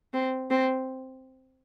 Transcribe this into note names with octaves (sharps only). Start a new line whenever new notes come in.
C4
C4